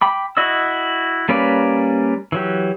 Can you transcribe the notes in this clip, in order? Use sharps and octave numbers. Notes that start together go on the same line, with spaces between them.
G5 B5 D6
E4 F#4 D#5 D#6 E6
G3 A#3 C#4 B4 D5
E3 F#3 G4